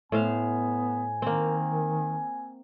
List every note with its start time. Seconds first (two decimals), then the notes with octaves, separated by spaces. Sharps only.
0.12 A2 B3 C5 F5 G#5
1.22 D#3 A#3 C4